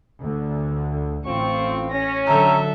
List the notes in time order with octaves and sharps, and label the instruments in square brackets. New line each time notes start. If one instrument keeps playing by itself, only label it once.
[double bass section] D2 D3
[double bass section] A1 [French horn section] C4 F4 [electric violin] C#6
[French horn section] C#4 [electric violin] A#6
[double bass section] D3 F#3 [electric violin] A4 E5 [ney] A#5